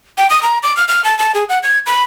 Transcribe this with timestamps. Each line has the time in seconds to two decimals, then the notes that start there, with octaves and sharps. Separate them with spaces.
0.18 G5
0.30 D#6
0.43 A#5
0.63 D6
0.77 F6
0.88 F6
1.04 A5
1.19 A5
1.35 G#4
1.49 F#5
1.63 G#6
1.86 B5